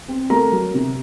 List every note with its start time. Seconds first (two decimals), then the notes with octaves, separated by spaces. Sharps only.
0.08 C4
0.30 A3 A#4 A#5
0.52 F#3
0.74 C3